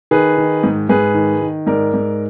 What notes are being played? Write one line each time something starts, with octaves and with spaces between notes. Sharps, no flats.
D#3 G#4 B4
D#3
G#2
G#2 G#4 B4
D#3
D#3
G#2 A#4 D5
G#2